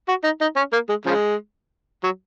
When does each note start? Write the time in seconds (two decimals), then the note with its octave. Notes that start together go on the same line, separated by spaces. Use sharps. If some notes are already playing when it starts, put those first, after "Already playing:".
0.08 F#4
0.24 D#4
0.41 D#4
0.56 C#4
0.73 A#3
0.89 G#3
1.06 C#3 F3 G#3
2.04 F#3